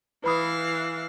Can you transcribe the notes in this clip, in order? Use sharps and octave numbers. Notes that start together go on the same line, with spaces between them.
E3 B4 F5 B5 D#6